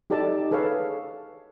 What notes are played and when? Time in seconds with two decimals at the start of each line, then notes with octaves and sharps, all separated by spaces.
0.10 D#4 G4 A4 D5 A5
0.51 G#4 A4 B4 C#5 F5